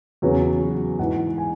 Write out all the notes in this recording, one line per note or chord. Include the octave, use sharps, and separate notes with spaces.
E2 C#3 F#3 B4
F#4
G#2 E3 F#5
G#5